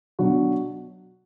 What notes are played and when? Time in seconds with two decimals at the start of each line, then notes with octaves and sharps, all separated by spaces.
0.19 B2 F#3 D4 F#4